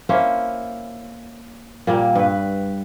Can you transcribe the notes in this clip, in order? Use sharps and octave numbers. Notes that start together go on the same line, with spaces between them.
A#3 C#4 E4 C5
A#2 G3 A#3
G2 B4